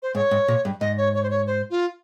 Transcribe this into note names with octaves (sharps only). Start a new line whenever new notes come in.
C5
G#2 C#5
G#2
A#2
G2
G#2 D#5
C#5
C#5
C5
C#5
C5
F4